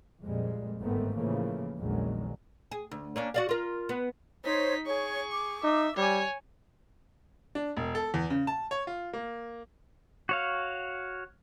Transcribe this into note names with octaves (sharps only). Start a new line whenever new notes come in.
F2 A#2 G3 G#3
G1 G#2 D#3 A3 B3 C4
A2 C#3 E3 F3 A3 A#3
A#1 E2 D3 D#3 F#3 G#3
G#4
D2
A#3 C#4 D4
F#4 D5 F5
F4 A#4
B3
D#4 C5 C#5 B6
G#4 C#5 C#6
D6
D#4 E5
G3 C#5 G#5
D4
E1
A4
E2
C#3
A5
C#5
F4
A#3
F#4 C#5 F5